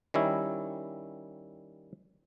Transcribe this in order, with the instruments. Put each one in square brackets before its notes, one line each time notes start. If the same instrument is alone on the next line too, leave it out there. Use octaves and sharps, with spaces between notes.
[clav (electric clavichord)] D#3 G3 C#4 E4